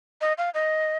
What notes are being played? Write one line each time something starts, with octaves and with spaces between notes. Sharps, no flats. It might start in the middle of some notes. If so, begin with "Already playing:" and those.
D#5
F5
D#5